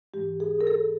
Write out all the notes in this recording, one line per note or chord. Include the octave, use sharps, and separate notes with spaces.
G#2 E3 G#3 G4
G#4
A#4
A4